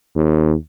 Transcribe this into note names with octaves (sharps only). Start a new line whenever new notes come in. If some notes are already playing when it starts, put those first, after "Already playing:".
D#2